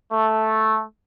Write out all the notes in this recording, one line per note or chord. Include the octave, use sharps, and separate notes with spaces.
A3